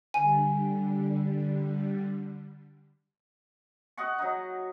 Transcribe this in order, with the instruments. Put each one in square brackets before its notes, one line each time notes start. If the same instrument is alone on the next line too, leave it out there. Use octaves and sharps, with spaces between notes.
[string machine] D3 G3 [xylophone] G#5
[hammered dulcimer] F#4 D#5 F#5 C#6
F#3 D#4